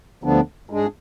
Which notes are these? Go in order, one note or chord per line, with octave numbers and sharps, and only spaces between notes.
D2 D3 F3 B3 D4
G#2 G#3 D4 G#4